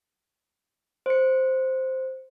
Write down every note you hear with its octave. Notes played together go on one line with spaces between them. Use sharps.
C5 C#7